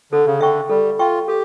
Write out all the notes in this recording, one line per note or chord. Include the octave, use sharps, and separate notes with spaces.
D3 A4
C#3
D3 E5 G5 C#6
G3 A4
F4 E5 G5 C#6
G4 A4